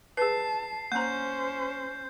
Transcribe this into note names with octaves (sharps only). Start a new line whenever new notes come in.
G#4 B4 A5 C7
A#3 C#4 C5 A#5 G6